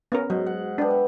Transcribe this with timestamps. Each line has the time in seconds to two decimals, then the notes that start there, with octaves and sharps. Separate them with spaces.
0.12 B3 C#4 A#4
0.30 G#2 F#3
0.46 F#5
0.78 B3 D4 G4
0.91 E5